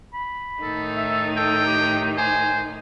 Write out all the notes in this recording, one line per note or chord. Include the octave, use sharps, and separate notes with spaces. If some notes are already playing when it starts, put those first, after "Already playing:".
B5
A2 D#3 D#4 A4
E5
A4 G5
G4
C5 G#5